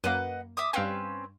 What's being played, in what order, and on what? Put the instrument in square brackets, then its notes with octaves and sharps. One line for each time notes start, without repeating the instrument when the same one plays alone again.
[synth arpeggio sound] F#2 A#3 [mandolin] B4 D#5 F#5
[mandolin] E5 D6 D#6
[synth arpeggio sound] G2 F5 G5 [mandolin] C4 C#4 B4